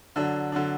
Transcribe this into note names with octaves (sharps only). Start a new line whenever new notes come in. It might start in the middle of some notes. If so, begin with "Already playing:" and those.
D3 F#3 D4
D3 F#3 D4